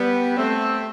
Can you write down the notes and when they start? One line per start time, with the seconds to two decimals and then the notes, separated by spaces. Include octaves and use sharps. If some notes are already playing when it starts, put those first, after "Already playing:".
Already playing: G3 B3
0.37 A3 C4